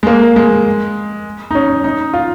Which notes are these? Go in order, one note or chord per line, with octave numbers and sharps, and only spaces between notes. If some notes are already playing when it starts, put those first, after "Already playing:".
G#3
A#3
G#3
D#4
C#4
D#4
F4